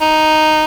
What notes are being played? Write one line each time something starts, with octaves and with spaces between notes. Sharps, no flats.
D#4